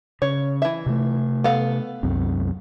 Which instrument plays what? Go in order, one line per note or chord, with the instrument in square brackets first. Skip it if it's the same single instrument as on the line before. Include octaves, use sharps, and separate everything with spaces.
[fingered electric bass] C#3 [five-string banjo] C#5
[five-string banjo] E3 E5
[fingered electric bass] C3 A3
[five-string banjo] B3 A4 F5
[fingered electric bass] C2 F#2 C4